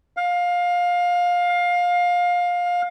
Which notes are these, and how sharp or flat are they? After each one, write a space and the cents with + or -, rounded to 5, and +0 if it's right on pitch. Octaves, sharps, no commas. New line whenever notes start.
F5 +20